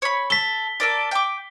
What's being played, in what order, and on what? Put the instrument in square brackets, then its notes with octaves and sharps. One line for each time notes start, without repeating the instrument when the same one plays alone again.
[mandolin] C#5 B5
[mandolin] A4 [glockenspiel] B6 G7
[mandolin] A4 A#4 D5
G5 D6